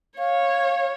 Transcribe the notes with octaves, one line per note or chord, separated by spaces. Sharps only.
C#5 F5